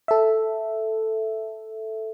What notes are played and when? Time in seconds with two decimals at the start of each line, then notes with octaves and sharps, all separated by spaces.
0.08 A4 E5